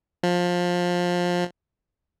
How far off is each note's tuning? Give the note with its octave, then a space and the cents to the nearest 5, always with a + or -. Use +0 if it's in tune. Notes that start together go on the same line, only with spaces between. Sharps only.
F3 +20